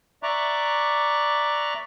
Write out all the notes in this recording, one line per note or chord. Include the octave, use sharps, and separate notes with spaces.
D5 E5 A#5 C#6 D6 F#6